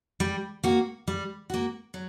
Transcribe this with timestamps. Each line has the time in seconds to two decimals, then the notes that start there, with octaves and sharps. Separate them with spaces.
0.20 G3
0.64 A#3 F#4
1.07 G3
1.50 A#3 F#4
1.94 F#3